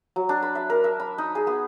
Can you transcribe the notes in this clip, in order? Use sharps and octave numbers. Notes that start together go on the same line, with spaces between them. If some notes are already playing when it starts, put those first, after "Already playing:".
F#3
D4
B5
E5
A#4
E5
B5
D#4
G#4
B3